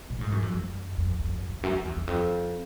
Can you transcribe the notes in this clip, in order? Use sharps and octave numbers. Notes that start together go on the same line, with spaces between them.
A#2
G#2
F#2
F2
F#2
F2
F2
F#2
E2
F#2
F2
E2
E2
F2